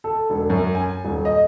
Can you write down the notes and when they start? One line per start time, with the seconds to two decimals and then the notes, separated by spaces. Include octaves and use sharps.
0.04 A4
0.30 E1
0.50 F#2
0.75 G#5
1.05 D#1
1.25 D#5